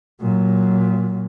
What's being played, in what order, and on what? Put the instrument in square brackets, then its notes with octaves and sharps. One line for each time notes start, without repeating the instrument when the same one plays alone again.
[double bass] A#2 F#3